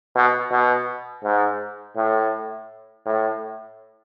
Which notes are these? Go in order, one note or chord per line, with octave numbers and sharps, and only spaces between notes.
B2
B2
G#2
A2
A2